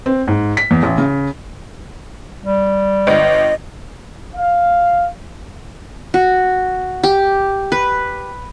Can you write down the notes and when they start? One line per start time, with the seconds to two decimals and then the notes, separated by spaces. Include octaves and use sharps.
0.06 C4
0.27 G#2
0.57 B6
0.71 E2
0.83 A1
0.98 C#3
2.43 G3
3.07 G1 D#5
4.36 F5
6.14 F#4
7.03 G4
7.72 B4